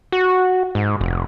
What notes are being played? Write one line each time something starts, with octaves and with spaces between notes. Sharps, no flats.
F#4
G#2
F1